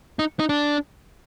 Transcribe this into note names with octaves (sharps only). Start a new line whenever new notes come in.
D#4
D#4
D4